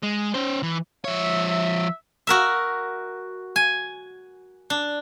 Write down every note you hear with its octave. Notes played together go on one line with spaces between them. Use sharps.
G#3
C#4 C5
E3
F3 C#5 E5
F#4 A#4 E5
G#5
D4